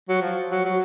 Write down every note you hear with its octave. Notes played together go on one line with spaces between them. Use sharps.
F#3
F3
F#3
F#3